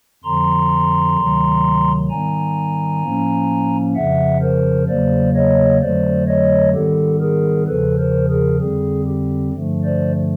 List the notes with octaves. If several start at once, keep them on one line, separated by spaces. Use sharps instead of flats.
F2 D3 F3 A#5 C6
D2 C3 D#3 F#3
G#2 D#3 G3 B3 G#5 A#5
A2 F3 A#3 C#4
F2 C#3 F3 E5 F#5
A#4 C5
E2 C#3 F#3 A#3 C5 D5
C#5 D#5
F2 D3 F#3 A3 C5 D5
C#5 D#5
G#2 D#3 G3 B3 G4 A4
G#4 A#4
E2 C#3 F3 A4 B4
A#4 C5
G#4 A#4
F2 D3 G3 C4 G#4
G4
G2 D3 F3 A3
C5 D5